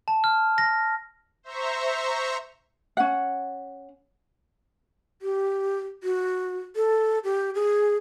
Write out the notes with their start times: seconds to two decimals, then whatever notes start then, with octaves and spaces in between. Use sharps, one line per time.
0.08 A5
0.24 F6
0.58 A#6
1.43 C5 E5 A#5 C#6
2.97 C#4 F#5
5.22 G4
6.03 F#4
6.76 A4
7.24 G4
7.55 G#4